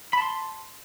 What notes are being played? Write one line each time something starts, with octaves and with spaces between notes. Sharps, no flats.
A5 B5 C6